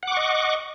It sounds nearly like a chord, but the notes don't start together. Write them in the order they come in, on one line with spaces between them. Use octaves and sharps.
F#5 D6 C#6 D#5